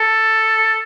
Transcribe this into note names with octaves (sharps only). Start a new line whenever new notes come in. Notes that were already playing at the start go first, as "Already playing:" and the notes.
Already playing: A4